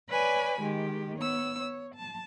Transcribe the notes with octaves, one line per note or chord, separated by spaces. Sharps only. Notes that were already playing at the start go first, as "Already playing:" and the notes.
B4 C#5 D5 G#5 B5
D#3 G#3 G4
B3 C#5 E6
C#5
A5